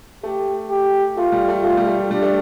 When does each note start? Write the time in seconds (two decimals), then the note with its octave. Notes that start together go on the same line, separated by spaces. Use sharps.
0.23 A3 G4
0.70 G4
1.17 A3 F4
1.32 G3
1.48 A3
1.64 A3 F4
1.77 G3
1.87 A3
2.11 G3 D4
2.22 A3